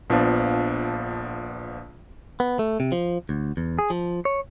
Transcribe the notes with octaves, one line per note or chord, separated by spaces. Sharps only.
A#1 F3 B3 D4 F5
B3
A3
C3
F3
D2
E2
G#4
F3
C#5